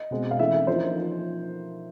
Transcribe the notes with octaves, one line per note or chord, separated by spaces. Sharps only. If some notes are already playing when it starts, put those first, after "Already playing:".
Already playing: D#5
B2 G#3 C4
F5
E3 A3 C#4 E5
F3 A#3 D#4 C5